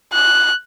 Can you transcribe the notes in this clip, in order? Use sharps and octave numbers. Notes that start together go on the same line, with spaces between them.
F#6